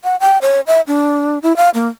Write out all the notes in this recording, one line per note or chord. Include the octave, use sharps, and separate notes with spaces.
F#5
G5
C#5
E5
D4
E4
F5
A#3